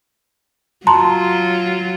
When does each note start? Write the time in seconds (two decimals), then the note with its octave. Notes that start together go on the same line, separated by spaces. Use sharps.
0.87 F#3 F4 A5 A#5 C6